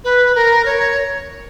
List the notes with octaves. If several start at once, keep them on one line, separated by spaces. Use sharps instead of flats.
B4
A#4
C#5